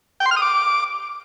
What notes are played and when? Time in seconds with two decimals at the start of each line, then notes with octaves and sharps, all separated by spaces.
0.20 G5
0.26 C6
0.31 F6
0.37 D#6
0.42 D6